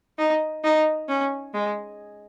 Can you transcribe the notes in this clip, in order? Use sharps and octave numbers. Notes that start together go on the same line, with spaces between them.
D#4
D#4
C#4
G#3